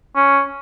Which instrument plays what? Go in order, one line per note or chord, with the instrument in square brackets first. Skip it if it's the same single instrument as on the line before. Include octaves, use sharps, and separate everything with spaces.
[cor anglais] C#4